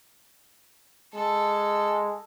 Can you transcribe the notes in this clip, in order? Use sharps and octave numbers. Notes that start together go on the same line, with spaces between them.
G#3 A4